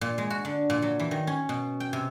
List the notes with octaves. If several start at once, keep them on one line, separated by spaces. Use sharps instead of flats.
A#2
G#3
F#4
D3
A#2
F#3
E3
D#3
C#4
B2
G5
C3